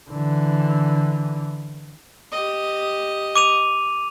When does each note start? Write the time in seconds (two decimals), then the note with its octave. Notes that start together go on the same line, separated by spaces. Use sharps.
0.10 D3 E3
2.32 G4 D#5
3.36 D6 D#7 F7